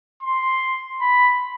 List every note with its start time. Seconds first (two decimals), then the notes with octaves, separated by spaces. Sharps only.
0.23 C6
1.01 B5